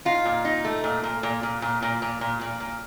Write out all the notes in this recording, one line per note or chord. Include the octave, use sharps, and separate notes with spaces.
D#4 F4
A#2
D#4
A3
A#2
A#2
A#2
A#2
A#2
A#2
A#2
A#2
A#2
A#2